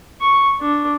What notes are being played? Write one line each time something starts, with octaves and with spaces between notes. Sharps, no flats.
C#6
D4